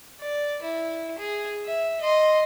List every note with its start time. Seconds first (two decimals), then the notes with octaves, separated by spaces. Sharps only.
0.20 D5
0.62 E4
1.19 G#4
1.65 E5
2.01 D#5 C6